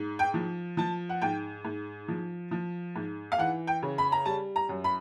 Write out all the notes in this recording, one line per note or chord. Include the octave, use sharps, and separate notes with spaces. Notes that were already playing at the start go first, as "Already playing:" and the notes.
Already playing: G#2
G5
F3
F3 A5
F#5
G#2 G5
G#2
F3
F3
G#2
F5
E3 F#5
G5
C#3
B5
A#5
G3 A5
A#5
F#2
B5